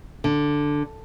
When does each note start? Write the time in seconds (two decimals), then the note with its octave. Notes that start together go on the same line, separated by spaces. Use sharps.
0.24 D3